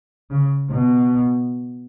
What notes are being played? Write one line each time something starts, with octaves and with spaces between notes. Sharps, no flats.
C#3
B2